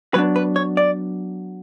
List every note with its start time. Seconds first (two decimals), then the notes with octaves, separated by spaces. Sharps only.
0.14 F#3 B3 D4 B4
0.36 B4
0.56 C#5
0.77 D5